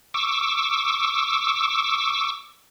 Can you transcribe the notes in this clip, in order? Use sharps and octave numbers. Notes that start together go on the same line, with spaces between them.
C#6 D6 E6